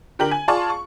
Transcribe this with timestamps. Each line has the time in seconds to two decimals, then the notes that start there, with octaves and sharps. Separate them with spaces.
0.19 D3 G4 A#4 F#7
0.31 G#5
0.48 F4 G#4 D5 A5 C6 C#6
0.70 C#6